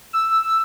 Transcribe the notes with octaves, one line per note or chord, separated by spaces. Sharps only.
E6